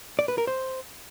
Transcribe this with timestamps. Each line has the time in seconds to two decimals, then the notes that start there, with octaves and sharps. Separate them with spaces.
0.19 D5
0.28 B4
0.38 A#4
0.47 C5